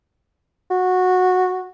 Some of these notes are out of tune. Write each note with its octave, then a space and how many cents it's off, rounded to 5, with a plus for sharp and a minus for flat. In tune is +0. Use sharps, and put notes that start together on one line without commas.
F#4 -10